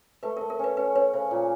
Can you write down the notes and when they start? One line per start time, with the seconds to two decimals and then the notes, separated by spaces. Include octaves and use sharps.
0.23 A3 B4
0.37 A#4
0.41 A3
0.50 A#4
0.59 C#4 B4
0.77 C#4 B4
0.95 C#4 B4 C#5
1.13 C#3 C5
1.31 A#2